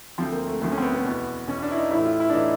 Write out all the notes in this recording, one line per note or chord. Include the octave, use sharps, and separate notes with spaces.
D2 D3 F3 C4
A#3
A3
D2 D3 F3 A3
C#4
C4
B3
B3
E2 B2
E2 B2 C#4
D4
E4
D#4
A1 A2 E3 E4
F4
E4
D4
A2 E3 D#4